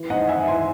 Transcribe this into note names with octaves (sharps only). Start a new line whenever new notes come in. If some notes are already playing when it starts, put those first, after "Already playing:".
Already playing: E3
G#2 D#5 F#5
G#2 E5 G#5
E3 G#5 C6